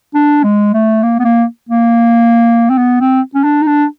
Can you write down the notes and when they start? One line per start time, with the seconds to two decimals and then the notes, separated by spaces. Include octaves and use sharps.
0.14 D4
0.43 G#3
0.74 A3
1.03 A#3
1.19 B3
1.24 A#3
1.69 A#3
2.70 C4
2.78 B3
3.01 C4
3.34 C#4
3.44 D4
3.62 D#4
3.67 D4